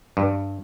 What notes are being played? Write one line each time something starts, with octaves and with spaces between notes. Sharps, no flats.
G2